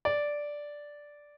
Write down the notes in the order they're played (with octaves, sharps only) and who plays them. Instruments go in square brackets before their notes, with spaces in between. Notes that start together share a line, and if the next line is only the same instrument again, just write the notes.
[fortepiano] D5